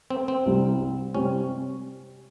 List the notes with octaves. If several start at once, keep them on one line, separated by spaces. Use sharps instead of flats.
C4
C4
C2 C3 G3
C3 G3 C4 C#4